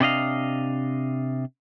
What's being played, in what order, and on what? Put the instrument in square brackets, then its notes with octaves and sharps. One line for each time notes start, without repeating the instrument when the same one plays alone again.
[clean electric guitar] C3 D4 D#5 F5